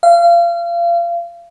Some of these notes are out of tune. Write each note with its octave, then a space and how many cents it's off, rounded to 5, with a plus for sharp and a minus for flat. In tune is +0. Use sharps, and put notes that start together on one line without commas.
F5 -30